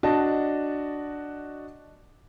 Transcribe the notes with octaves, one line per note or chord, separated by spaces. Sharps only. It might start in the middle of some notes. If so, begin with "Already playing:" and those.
D4 F#4 D#5 A5